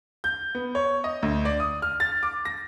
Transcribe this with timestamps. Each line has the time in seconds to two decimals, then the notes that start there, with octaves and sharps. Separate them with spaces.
0.24 G6
0.55 B3
0.75 C#5
1.04 D#5
1.22 D2
1.45 D5
1.60 D#6
1.82 F6
2.00 A6
2.23 D6
2.45 A#6